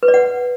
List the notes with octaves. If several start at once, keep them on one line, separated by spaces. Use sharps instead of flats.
B4
D5
F#5